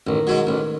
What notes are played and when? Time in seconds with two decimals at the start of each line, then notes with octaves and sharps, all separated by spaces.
0.07 A1 D#3
0.27 G#2 F#3
0.47 A1